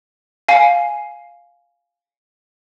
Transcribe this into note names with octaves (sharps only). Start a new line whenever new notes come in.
F5 G#5 C7